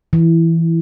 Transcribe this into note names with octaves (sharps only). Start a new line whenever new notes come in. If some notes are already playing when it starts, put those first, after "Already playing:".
E3